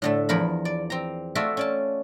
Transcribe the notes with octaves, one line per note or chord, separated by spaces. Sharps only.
A2 D3 A3
E2 F3 A#4 B5
D5
C4 A#5
A3 F4 F#4 D5 E5
C#4 D5 A5